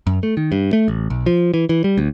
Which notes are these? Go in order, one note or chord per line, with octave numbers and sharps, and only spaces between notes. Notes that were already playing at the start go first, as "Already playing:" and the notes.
F#2
A3
D#3
G2
A3
A1
B1
F3
E3
E3
G3
D2